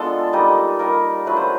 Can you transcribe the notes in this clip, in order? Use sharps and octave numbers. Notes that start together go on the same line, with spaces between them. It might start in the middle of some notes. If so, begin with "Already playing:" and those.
Already playing: G#3 B3 D4 F4 A4
G3 A#3 D#4
G3 A#3 D#4 A#4
F#3 A3 D4 F4 B4
C5